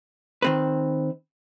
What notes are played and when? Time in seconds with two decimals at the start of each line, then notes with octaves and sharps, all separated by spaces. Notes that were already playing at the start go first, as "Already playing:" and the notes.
0.42 D#3 C4 B4